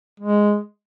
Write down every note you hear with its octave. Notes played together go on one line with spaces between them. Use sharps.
G#3